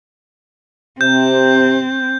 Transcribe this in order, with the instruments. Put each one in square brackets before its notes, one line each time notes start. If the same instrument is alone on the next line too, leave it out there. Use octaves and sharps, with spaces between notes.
[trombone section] C3 [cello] C4 [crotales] G6